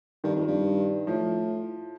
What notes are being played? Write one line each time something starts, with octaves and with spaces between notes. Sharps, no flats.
G2 D#3
F2
G2
A2 F3